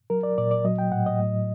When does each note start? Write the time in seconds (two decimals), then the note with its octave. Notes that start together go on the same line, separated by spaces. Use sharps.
0.10 F#3 A#4
0.23 D5
0.38 A#2 D5
0.51 D5
0.65 F#3 D#5
0.79 G5
0.92 A2 F#5
1.06 D#5
1.19 A2